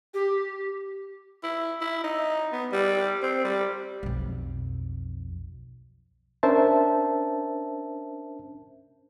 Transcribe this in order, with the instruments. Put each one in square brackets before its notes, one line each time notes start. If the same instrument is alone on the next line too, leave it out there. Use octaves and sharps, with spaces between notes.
[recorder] G4
[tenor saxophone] E4
E4
D#4
B3
G3
C4
G3
[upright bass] B1 F2
[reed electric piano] C#4 D4 A#4 C5 E5 A5